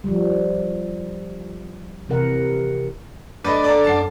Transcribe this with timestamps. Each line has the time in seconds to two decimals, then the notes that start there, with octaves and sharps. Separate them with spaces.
0.04 F3 G3
2.09 C3 E3 A#4 F#5
3.45 A3 D4 B4 D#5
3.64 D5 A#5
3.84 F#2 F#5 A5 C7